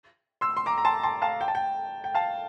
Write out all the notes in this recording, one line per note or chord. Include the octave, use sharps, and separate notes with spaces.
C6 E6
C6
A#5 D6
A#5
A5 C6
A5 C6
F5 A5
G5
A5
G5
G5
F5 A5